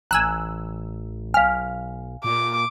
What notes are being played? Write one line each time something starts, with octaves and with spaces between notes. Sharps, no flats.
A1 G#5 A#5 E6 F#6
B1 F5 G#5 F6
A#2 D6